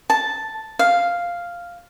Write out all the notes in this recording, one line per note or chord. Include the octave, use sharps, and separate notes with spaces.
A5
F5